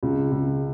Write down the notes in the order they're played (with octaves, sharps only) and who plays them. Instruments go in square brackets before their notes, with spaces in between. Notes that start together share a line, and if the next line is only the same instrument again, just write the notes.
[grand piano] C#2
C#2